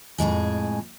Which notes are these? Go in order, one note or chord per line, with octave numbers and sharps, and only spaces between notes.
F2 A2 G#3 G#4